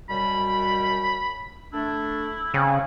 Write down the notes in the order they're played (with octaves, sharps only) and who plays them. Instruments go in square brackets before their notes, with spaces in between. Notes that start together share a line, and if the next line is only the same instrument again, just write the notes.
[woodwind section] F#2 B2 G3 [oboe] B5
[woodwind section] A3 D4 [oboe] E4
[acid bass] C#3 [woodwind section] C4 C#4